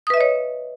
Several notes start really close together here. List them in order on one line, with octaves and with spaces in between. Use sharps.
D#6 B4 E5 D#5 C#5